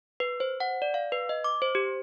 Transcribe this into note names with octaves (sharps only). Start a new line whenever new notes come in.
B4
C5
F#5
D5
F5
B4
D#5
D6
C5
G4